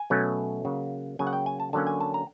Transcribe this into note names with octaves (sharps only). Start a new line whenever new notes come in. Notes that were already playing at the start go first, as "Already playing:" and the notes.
Already playing: G#5
B2 F#3 A3 C#4
C#3 F#3 A#3
C#3 F#3 A#3 G#5
F#5
G5
G#5
A5
D3 F#3 A#3 C#4 A5
G#5
A5
A#5